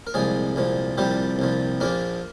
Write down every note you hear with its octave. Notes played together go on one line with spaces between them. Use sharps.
A#4
C2 A#2 F3 G#3 G#4
C2 A#2 F3
C2 A#2 F3 G3 G4
C2 A#2 F3
A#1 A#2 F3 A#3 A#4